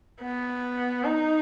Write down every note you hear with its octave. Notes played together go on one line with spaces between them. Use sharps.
B3
D#4